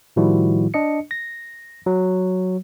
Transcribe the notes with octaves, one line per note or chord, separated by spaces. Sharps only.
A2 D#3 F3 G3 E4 F#4
D4 D#5 C#7
A#6
F#3